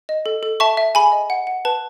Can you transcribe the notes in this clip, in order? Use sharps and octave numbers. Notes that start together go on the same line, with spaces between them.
D#5
A4
A4
E5 A5 C#6
E5
G#4 G#5 B5
D#5
F#5
F#5
B4 A5